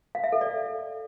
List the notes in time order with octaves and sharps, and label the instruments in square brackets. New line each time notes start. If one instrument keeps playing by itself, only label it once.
[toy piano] F5
E5
A4
D5